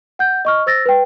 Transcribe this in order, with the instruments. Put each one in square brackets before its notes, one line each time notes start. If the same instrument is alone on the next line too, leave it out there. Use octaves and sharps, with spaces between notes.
[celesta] F#5 G6
D#5 C#6 F6
C5 E6 A6 A#6
B4 G5